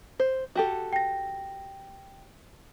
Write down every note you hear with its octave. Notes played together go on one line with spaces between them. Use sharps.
C5
F#4 G4 A4
G5 A#6